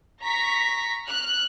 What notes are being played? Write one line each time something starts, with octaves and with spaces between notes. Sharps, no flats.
A#5 C#6 A#6 B6
F6 F#6